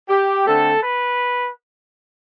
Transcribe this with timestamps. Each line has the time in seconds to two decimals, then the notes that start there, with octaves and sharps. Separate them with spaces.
0.09 G4
0.46 D3 A3 C4 A4
0.83 B4